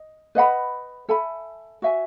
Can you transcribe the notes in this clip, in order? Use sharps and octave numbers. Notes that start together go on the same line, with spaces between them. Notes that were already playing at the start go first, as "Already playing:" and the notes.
Already playing: D#5
B4 D#5 F#5 B5
A4 E5 G#5 B5
F#4 C#5 E5 G#5